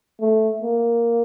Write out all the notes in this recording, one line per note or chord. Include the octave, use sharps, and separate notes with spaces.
A3
A#3